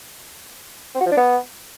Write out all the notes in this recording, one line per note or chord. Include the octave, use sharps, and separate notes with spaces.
C4
F#4
F3
D4
B3